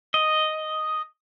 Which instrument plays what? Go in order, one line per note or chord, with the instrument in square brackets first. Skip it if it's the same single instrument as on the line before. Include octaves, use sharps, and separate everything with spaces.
[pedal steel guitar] D#5